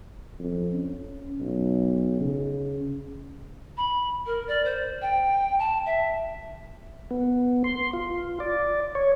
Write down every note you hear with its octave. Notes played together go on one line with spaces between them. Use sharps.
F2
C#4
B1
C#3
B5
A#4
D5
C5
G5
A5
E5
B3
C6
F4
D5
C#5